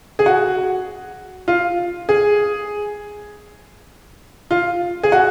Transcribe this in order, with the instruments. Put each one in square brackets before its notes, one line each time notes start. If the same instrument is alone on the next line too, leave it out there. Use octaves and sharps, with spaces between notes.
[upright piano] G#4
F#4
F4
G#4
F4
G#4
F#4